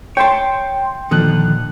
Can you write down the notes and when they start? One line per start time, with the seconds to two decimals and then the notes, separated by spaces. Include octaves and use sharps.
0.17 C#5 E5 G5 A5 C6
1.11 A#2 D3 D#3 F3 F#6